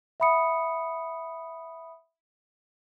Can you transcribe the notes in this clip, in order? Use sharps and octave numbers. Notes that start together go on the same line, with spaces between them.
E5 F#5 B5 D#6 C#7